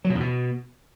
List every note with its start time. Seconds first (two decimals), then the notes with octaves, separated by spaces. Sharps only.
0.04 F#3
0.10 B2
0.15 E2
0.20 B2